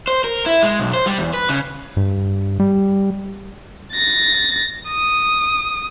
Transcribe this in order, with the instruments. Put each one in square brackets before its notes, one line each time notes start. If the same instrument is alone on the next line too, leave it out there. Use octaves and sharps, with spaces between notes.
[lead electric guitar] C5
A#4
E4
G#3
B1
C5
G3
E2
B4
C#3
[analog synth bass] G2
G3
[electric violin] A6 A#6
D#6